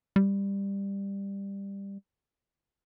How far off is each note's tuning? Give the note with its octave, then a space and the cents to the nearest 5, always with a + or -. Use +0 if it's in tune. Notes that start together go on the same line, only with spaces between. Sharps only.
G3 +15